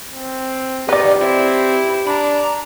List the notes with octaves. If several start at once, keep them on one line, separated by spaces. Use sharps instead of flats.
C4
D#4 F4 G4 B4 D5
C4 E4
D4 A#5 B5